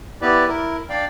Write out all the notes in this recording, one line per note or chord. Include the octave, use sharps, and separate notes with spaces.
B3 E4 G4 B4 D5
E4 A#4
D4 D5 F5 G5